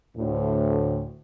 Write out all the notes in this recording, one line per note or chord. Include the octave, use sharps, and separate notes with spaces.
D2 A2